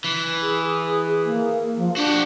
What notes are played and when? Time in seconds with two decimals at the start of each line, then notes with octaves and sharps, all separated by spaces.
0.04 E3
0.42 G#4
1.25 A#3
1.77 F3
1.96 D4 F#4 G4